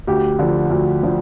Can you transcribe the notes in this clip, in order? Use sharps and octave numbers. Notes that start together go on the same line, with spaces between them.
D2 G4
D3 F3
D2
D3 F3